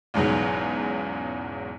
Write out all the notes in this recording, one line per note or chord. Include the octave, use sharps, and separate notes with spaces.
B1 E2 G#2 C#3 F#3